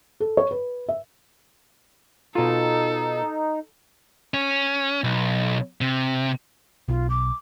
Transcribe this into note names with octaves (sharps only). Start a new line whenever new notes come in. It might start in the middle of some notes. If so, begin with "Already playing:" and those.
A4
C#5
B4
E5
B2 D#4 F4 A4
C#4
B1
C3
B1 F4
D6